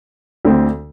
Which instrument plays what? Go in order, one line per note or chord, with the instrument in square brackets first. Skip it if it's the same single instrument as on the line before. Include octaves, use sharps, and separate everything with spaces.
[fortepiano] D2 D3 C4